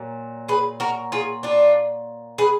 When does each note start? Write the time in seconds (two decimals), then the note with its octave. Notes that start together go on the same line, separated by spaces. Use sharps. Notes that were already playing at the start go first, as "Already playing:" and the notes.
Already playing: A#2 F#3
0.48 G#4 B4
0.80 F#4 A#4
1.12 F4 G#4
1.43 D4 F4
2.38 G#4 B4